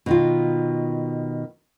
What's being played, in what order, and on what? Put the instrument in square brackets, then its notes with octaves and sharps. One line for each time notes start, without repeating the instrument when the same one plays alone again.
[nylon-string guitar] B2 D#3 F4